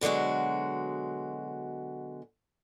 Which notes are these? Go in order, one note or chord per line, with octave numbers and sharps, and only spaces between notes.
B2 D3 F#3 G#3 F#4